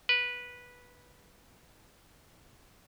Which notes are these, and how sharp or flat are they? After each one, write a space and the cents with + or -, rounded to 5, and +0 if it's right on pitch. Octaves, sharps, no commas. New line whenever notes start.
B4 -10